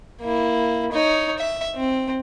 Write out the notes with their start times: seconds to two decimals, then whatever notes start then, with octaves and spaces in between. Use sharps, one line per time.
0.21 A#3 E4
0.92 D#4 C#5
1.39 E5
1.76 C4